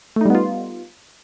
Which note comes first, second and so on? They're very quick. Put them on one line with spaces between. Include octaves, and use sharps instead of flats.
A3 D#4 G3 B3 F4